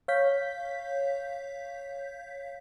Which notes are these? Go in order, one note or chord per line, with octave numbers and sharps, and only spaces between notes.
C#5 F5 G6 B6